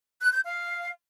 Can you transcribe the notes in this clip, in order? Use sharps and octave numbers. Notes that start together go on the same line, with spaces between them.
F#6
G6
F5